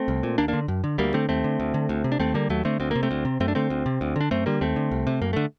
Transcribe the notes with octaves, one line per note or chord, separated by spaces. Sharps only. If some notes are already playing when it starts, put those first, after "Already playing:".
Already playing: A3 C4
C2
A#2
D#2 A#3 D4
D3 A#3 D4
F#2
D3
D2 G3 A#3
D3 A3 C4
D#2 A3 C4
D3
D2
D3
D2
C3
D4
D#2 A3 C4
D3 G3 A#3
D#2 F#3 A3
D3 A3 C4
D2 C4
C3 A#3
A3 C4
D2
C3
F#2 A3 C4
D4
D3 A3 C4
D2
C3
D2
D3 D4
F#2 A3 C4
D3 G3 A#3
D#2 A3 C4
D3
C2
C3
F#2 A#3
D3 A3